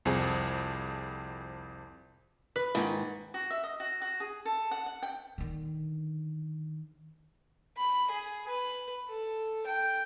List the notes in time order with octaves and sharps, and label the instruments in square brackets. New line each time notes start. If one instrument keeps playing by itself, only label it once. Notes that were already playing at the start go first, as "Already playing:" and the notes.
[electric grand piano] C2 F2 C4 G#4
[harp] B4
[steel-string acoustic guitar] G#2 D#3
[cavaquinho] F#4
E5
D#5
F#4
F#4
G#4
A4
F#5
F#5
G5
[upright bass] D3 D#3
[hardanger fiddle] B5
G#4
B4
A4
G5